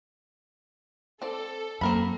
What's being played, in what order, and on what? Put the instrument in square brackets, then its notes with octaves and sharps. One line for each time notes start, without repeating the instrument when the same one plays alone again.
[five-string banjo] C4 D5 [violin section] A4
[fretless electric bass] F#2 [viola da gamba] A#3 [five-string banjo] C4 A#4 B5